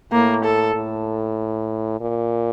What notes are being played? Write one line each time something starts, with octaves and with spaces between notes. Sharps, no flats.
A2 A#3
A4
A2
A#2